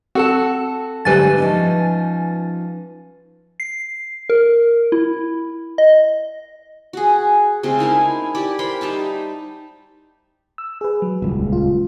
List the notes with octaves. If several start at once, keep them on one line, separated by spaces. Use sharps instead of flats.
C4 F#4 A4 A5
G#2 D3 F#3 G3 A3 B4 G#5 A6
F3 C#4 D#4
C7
A#4
E4
D#5
F#4 G#4
C#3 G#3 A3 C4
D#4 E4 A#4 G#5
E4 G4 D5
A#4 C5 G5 B5
G3 D#4 E5 A5
E6
G#4 B4
F#3
D#1 C#2
F4